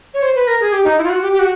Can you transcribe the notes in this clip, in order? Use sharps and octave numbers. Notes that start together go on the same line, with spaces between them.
C#5
C5
B4
A#4
G#4
G4
D#4
E4
F4
F#4
G4
G4
F#4